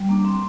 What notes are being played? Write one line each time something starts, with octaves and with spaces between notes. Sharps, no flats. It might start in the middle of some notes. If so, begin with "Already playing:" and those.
Already playing: G3
A#3 D4
C4